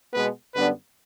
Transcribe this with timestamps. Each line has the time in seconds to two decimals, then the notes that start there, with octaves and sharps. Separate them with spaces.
0.13 B2 G#3 B3 B4
0.55 F#2 D3 G3 B3 D4 B4